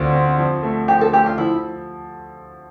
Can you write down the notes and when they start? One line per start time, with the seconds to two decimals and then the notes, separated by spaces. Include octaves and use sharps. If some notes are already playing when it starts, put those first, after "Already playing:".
Already playing: D2 D3 C4 F4
0.13 C4
0.38 F3
0.63 A3
0.88 F3 G4
1.01 A4
1.13 A3 G4
1.26 F4
1.38 F3 E4